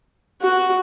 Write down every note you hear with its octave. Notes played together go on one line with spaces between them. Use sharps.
F#4